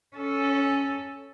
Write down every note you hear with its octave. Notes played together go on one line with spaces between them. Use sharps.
C#4 A4